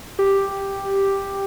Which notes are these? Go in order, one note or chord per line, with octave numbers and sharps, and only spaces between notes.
G4